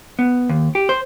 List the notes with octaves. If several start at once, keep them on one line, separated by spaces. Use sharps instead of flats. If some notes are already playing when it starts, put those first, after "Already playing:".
B3
D#2
G4
C5